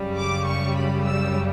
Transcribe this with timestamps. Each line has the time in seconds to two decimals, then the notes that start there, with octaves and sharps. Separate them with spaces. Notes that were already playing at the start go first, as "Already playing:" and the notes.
Already playing: F#2 C#3 G3
0.17 D6
0.46 C#6
0.76 B5
1.05 E6